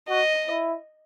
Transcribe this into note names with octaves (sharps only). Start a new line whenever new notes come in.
F#4 D#5
E4